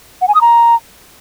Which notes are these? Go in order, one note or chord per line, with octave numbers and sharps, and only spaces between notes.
F#5
G#5
D#6
A#5